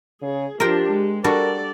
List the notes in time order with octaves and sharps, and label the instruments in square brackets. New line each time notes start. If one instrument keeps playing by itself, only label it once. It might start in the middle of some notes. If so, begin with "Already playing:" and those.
[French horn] C#3 [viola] G#4
[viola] F3 D4 [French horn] G4 [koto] A#4 C5 G5
[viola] G#3
[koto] G3 D4 F#4 [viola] A4 D5 [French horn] A#4